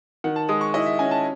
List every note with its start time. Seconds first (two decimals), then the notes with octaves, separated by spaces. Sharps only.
0.24 D#3 F#5
0.36 A5
0.49 G#3 D#6
0.61 C#6
0.74 E4 D#5
0.86 E5
0.99 C#4 G#5
1.11 A5